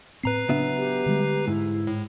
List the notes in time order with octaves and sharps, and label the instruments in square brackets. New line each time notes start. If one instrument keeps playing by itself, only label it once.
[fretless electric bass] A2 C4 [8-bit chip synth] B4 A#5 C7
[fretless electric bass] C#3 D4 [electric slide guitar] F#3 B3 E5
[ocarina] G4
[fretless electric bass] D3 G3 G#3
[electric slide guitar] G#2 [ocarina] E4
[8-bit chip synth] A2